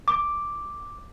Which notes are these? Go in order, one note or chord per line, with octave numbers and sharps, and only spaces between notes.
D6